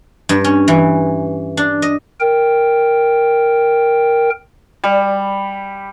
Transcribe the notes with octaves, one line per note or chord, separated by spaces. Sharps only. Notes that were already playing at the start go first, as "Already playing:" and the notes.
G2
C#4
E3
D4
D#5
A#4 G5
G3